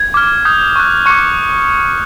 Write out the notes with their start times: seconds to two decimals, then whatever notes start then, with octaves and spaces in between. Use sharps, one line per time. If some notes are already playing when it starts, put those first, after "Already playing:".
Already playing: G#6
0.14 D6 F6
0.45 D#6 G6
0.76 C#6 F#6
1.06 C#6 D6 F#6 C#7